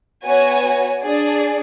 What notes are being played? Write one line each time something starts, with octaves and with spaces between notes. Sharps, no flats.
B3 F#4 C#5 G#5
D4 G#4 D5